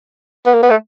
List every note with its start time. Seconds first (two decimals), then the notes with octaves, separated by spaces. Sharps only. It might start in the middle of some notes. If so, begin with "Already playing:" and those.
0.46 B3
0.54 A#3
0.63 B3
0.70 A3